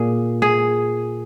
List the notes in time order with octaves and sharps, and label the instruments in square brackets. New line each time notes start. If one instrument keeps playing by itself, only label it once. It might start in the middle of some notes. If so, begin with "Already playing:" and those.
Already playing: [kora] A#2 G#4
G#4